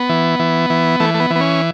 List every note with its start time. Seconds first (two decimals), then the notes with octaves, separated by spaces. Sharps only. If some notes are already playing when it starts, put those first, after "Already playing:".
Already playing: B3
0.09 E3
0.39 E3
0.70 E3
1.00 E3 A3
1.14 A3
1.20 B3
1.30 E3
1.36 B3
1.40 C#4